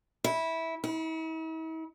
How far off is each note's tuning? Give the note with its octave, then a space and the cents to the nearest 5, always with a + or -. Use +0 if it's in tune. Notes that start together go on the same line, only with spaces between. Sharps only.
E4 -15
E4 -45